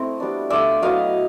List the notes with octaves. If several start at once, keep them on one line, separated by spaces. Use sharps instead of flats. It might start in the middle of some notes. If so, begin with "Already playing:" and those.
Already playing: A3 C4 E4 D#5
G3 B3 D4
A3 D4 F4 D5 E5
F#3 B3 E4 D#5 F5